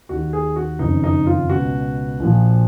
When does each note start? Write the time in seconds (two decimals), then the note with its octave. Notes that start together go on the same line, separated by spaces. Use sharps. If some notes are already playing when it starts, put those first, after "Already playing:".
0.09 D#2 D#3 F#4
0.33 G#4
0.56 F#4
0.79 F#1 F2 D#3 D#4
1.04 D#4
1.26 F4
1.49 C#2 B2 F#4
2.20 A#1 A#2 F3